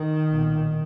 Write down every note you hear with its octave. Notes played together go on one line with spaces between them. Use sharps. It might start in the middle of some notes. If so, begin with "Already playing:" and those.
Already playing: D#3
B1 A#2